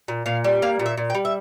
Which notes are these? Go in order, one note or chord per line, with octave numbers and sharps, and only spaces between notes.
A#2
A#2 F5
G3
A#3 F5
A#2
E5
A#2
G5
G3
E5